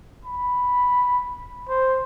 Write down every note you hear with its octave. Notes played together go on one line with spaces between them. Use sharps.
B5
C5